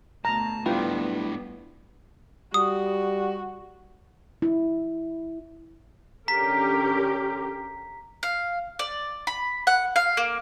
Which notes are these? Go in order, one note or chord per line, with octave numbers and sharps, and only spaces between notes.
D2 B2 A5 A#5
A2 G3 B3 D4 E4 F4 B4 G5
G3 F#4 D#6
E4
D3 C#4 G4 A#4 A#5 B6
F5
D5
B5
F#5
F5
A#3